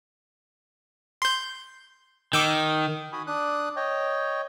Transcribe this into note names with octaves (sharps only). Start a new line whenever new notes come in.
C6 G6
D#3 D6 E6 G6
F#4 G#5 B5 D#6
D4 D#6 F#6
C#5 D#5 G5